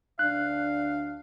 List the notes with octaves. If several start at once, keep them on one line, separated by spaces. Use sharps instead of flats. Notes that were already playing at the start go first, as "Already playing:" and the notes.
D2 D4 F5 F#6